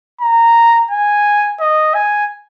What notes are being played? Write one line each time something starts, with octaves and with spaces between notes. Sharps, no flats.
A#5
G#5
D#5
G#5